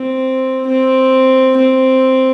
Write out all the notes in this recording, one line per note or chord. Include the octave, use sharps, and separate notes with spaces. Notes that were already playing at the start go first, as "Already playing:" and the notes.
Already playing: C4
C4
C4